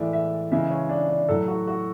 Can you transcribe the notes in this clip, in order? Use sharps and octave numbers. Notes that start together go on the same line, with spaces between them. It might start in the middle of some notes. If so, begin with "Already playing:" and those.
Already playing: A2 E3 G#3 D5 E5
E5
C#3 E3 G#3 E5
C#5
D4
D4
A2 F#3 A4
F#4
F#4